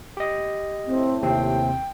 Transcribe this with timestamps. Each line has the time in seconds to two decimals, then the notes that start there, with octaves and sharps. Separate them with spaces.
0.17 G4 D#5
0.86 A2 C4
1.22 D#2 C3 C4 G5